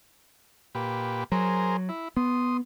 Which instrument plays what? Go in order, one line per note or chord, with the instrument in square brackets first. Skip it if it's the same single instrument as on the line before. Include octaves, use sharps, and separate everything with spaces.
[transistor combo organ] A#2 G4 B4
[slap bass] F#3 [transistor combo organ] G#4 A#4 C5
[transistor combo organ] E4
[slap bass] B3 [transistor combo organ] C6 D#6